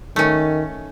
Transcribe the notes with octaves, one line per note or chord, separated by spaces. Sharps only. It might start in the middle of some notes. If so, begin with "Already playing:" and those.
D#3 A3 C#4